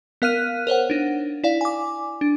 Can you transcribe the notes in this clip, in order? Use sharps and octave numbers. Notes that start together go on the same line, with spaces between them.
B3 A#4 F5 F6 F#6 D#7
A#4 C5 C#5 F#5
D4 D#4
E4 D5 F5
G#5 D6
D4